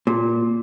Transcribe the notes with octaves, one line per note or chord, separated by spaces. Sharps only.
A#2